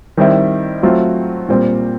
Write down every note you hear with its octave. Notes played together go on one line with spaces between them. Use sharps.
D#3 G3 C4 E4
F#3 A3 C4 F4
A#2 G3 C4